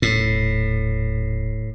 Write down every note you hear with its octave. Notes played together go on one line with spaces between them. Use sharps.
D#1 A2